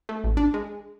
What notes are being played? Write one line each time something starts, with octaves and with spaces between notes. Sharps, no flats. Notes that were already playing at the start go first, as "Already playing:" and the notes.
A3
A1
D4
G#3